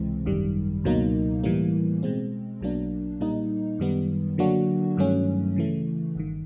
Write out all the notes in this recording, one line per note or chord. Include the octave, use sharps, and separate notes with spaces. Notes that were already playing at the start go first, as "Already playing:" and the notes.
Already playing: C#2 C3 E3 G#3 C4
G#1 F#2 D#3 G3
C#2 B2 F#3 A#3 D#4
A2 E3 G3 A#3
B2 G#3 C4
B1 B2 F#3 A#3 D4
A#2 G3 A#3 D#4
F#2 D#3 G3 B3
D3 F#3 A#3 D4 F#4
G2 D#3 F#3 A3 C#4
C#3 E3 A3
G1 G2 D#3